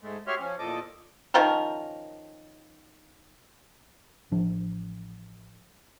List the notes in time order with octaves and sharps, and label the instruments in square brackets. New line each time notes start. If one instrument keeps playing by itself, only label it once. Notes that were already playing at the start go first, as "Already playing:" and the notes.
[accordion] G#2 G#3 A3
F#4 G4 C#5 E5 C6 F6
F3 C#4
E2 A#2 F3 A4 D#5 D6
[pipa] D#3 F3 C#4 A#4
[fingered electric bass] A1 F3 D4